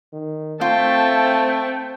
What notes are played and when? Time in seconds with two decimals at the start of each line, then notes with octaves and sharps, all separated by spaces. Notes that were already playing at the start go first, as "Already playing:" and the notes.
0.13 D#3
0.61 A3 C4 F4 G5 A5